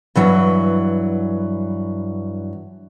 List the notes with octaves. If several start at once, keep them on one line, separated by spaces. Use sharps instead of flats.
G2 E3 F#3